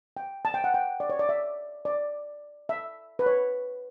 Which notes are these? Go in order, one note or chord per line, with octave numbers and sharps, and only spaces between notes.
G5
A5
G5
F#5
G5
D5
C#5
D5
E5
D5
E5
B4
C#5